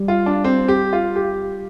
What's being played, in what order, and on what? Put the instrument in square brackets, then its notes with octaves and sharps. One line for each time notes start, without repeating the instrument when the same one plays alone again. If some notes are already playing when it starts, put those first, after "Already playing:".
Already playing: [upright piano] G3
[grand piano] F4
D4
C4
G4
F4
G4